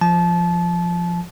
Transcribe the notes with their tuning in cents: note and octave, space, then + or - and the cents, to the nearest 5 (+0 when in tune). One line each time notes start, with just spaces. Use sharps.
F3 -5 A5 -25